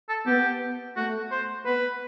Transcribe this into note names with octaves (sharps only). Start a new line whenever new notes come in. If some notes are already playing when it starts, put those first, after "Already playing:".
A4
B3 G4
A3 F#4
C5
B3 B4